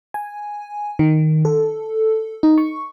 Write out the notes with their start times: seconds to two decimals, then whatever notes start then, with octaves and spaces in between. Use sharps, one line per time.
0.14 G#5
0.99 D#3
1.45 A4
2.43 D#4
2.58 C#6